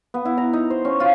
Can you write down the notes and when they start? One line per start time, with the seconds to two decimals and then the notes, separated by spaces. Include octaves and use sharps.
0.14 B3
0.25 E4
0.38 A#5
0.53 D#4
0.70 C5
0.85 C#4
1.00 F4